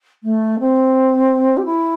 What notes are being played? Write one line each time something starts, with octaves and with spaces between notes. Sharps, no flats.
A3
C4
G4
E4